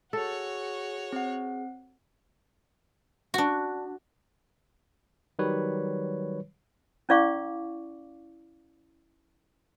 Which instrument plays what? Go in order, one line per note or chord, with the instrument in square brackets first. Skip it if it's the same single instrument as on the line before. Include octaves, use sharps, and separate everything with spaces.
[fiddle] F#4 C#5 [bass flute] G#4 [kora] A4
[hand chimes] C4 F#5
[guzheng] D4 F#4
[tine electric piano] D#3 F#3 G3 B4 C#5
[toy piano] C#4 E4 D5 F5 C#6 D6